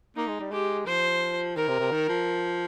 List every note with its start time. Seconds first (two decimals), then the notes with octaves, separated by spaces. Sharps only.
0.16 A#3 D#4
0.28 G#3
0.40 G3
0.52 G#3 G4
0.86 F3 C5
1.56 D#3 A#4
1.68 C3
1.79 C3
1.91 D#3
2.09 F3